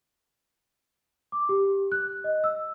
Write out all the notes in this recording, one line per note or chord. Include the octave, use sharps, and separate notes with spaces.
D6
G4
F#6
D#5
E6